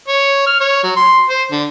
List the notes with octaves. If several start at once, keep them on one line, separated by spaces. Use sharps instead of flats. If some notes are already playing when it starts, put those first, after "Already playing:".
C#5
F6
C#5
F#3
C6
C5
D3